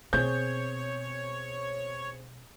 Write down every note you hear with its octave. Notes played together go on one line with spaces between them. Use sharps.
B2 C4 G#4 C#5 G6